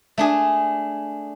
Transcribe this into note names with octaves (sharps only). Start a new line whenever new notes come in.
A3 D4 G#4